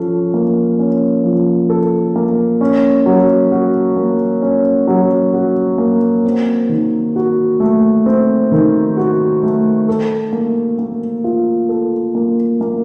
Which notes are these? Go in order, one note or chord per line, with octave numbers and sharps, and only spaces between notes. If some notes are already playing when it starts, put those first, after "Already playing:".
Already playing: F3 C#4 A4
A#3
C#4
F3
A4
A#3
C#4
F#3
F#4
A#3
C#4
F#3
F#4
A#3
C4
D#3
F#4
A3
C4
D#3
F#4
A3
A4
A#3
A#3
F4
A4
A#3
A#3